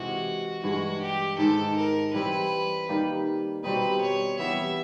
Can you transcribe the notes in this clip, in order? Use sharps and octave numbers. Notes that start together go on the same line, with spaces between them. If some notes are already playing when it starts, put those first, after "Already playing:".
Already playing: C3 E3 G#3 F#4
G2 E3 G#3 F#4
G4
G#2 D#3 G#3 A4
A#4
E3 G3 C4 E4 B4
D#3 G3 A#3
B2 G3 C4 D#4 B4
C#5
E3 G3 B3 E5